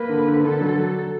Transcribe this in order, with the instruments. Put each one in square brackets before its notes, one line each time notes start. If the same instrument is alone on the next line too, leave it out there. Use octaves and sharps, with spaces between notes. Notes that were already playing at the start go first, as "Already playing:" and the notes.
Already playing: [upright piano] A#3 [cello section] B4
[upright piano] D3
D3
[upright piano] D3 [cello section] A4
[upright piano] F#3